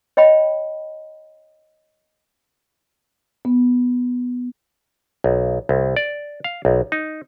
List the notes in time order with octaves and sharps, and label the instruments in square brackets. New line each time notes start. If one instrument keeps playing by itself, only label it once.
[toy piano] C#5 D#5 G5 B5
[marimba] B3
[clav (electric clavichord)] B1
C2
D5
F5
B1
D#4